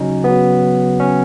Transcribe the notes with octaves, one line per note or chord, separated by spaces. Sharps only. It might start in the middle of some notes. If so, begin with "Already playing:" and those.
Already playing: C#3 F#3 C#4 D#4
C#3 F#3 B3
C#4